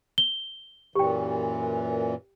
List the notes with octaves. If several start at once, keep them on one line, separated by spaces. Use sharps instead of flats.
G7
F#2 A#2 E3 G4 G5